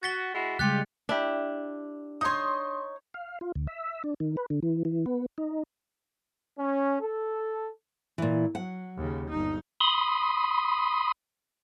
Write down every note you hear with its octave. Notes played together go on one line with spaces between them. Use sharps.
F#4 A6 B6 G7
G#3 E4 F#4
C#3 G3 G#3 F4 G4 F#6 A6 C#7
D4 E4 G4
D#4 C#5 C6 D#6
F5
F4
D2
E5
D4
D#3
B4
D3
E3
E3
B3
D#4
C#4
A4
A#2 E3
F#3 F#5
D#2 C#3
G1 D#4
B5 C6 D#6